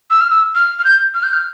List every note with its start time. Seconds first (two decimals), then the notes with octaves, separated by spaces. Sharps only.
0.10 E6
0.21 F6
0.30 E6
0.55 F6
0.79 F6
0.85 G6
1.14 F6
1.23 G6
1.33 F6